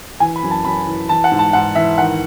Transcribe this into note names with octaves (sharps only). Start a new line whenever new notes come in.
E3 G#5
B5
F#2
A5
F#2 B5
E3
E3 A5
F#5
G#2
A5
G#2 F#5
E3 E5
D#3 F#5